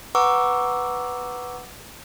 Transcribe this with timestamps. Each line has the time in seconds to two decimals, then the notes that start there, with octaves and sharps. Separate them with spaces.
0.15 B4 F#5 A#5 C#6 D6 E6